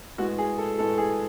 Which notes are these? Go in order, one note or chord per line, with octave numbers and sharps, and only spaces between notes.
A2 G#3 B3 F#4
G#4
A4
A2 G#3 B3 A4
G#4